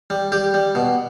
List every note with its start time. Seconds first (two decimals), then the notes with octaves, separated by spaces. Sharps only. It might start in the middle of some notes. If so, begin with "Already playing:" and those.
0.10 G3
0.32 G3 G4
0.54 G3
0.75 B2